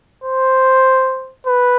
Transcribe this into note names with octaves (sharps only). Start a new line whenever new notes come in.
C5
B4